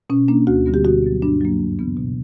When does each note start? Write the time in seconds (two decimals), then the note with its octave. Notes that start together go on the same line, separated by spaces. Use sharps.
0.10 B2 C#4
0.28 A#3 D4
0.47 D2 F#4
0.66 D3 G3 B3
0.74 G4
0.84 B2 F#4
1.03 F#3 B3
1.22 G2 D4
1.41 F#3 A#3
1.60 F#2
1.79 C#3 E3 B3
1.97 B2